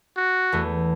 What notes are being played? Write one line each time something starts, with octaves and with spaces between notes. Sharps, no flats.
F#4
E2 A3